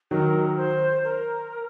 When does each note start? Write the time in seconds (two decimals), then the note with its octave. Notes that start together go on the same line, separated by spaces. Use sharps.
0.11 D#3 F#3 A#4
0.57 C5
1.04 A#4